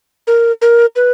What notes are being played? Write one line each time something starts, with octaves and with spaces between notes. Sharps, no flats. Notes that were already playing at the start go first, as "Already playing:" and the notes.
A#4
A#4
B4